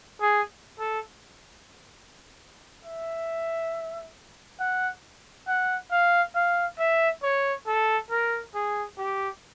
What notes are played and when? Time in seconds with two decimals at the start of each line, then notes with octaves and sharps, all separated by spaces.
0.21 G#4
0.79 A4
2.84 E5
4.59 F#5
5.47 F#5
5.91 F5
6.35 F5
6.79 E5
7.23 C#5
7.67 A4
8.10 A#4
8.54 G#4
8.98 G4